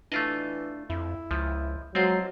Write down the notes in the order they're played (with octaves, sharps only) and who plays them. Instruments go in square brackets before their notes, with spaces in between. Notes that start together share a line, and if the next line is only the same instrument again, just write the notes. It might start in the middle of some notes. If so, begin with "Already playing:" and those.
[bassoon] E3 [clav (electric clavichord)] A3 F4 D#5 [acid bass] D4
[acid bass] F2 [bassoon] E4
[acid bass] C#2 [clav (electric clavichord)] F3
[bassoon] F3 [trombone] F#3 [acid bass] G#3 [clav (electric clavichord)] C4 F4 C5